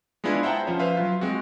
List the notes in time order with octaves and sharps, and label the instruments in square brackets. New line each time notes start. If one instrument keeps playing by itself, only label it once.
[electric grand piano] G#3 B3 D4 E4 F4 G#4
C5 E5 F#5 G5 A5 A#5
F3 C#4 F4 C5 C#5
B4 C5 E5 F5
F#3 F4
G#3 C4 F#4